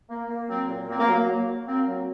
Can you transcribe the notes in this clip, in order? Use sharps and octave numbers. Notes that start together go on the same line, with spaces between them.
A#3
A#3
F#3 C4
A#2
A#3 C4
A#3
F#3
A#3
F#3
F#3
A#3 C4
F#3